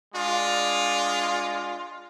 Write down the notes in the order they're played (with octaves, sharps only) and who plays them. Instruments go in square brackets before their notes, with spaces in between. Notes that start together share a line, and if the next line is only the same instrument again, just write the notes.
[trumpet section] G#3 D4 F4